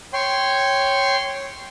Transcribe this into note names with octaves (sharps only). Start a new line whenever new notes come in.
C#5 G5 C6